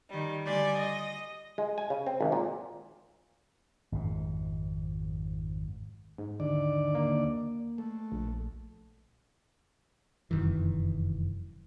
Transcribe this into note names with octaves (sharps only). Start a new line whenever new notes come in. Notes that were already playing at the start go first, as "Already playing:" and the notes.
D#3 G3
D3 G3 D5 G#5 C6
D#5
G#3
G#5
C#3
C4
G#1
A#2
G#1 F2 G#2
G#2
D#2 D3 D5
A#3
A3
A#1
F1 F#2 D#3 E3